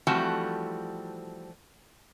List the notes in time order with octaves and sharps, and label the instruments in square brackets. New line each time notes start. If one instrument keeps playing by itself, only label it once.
[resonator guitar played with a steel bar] E3 F3 G3 A3 C4 F#4